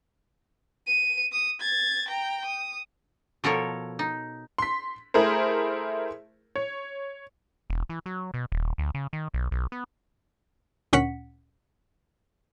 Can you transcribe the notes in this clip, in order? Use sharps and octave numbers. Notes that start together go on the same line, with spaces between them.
D#7
D#6
G#6 A6
G5 A#5
D#6
B2 F3 A4 A#4 C#5
D#4
C6 B6
A3 E4 G#4 A#4 C5
C#5
E1
E3
F#3
B2
D#1
D2
C#3
D#3
B1
B1
B3
D2 A#2 C#4 F#5 B6 C#7